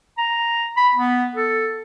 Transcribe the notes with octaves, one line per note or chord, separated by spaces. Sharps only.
A#5
B5
B3
A4